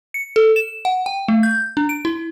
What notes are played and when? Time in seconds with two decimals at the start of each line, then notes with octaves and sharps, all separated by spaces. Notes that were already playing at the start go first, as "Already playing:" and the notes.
0.14 C#7
0.36 A4
0.56 E7
0.85 F#5
1.06 G5
1.28 A3
1.43 G6
1.77 D4
1.89 D7
2.05 E4